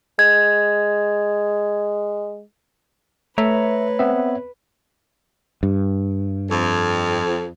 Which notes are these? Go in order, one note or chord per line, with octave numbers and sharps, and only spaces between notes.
G#3 G#6
A3 B4 C#5 E5 A#5
B3 C4 E5
G2
F2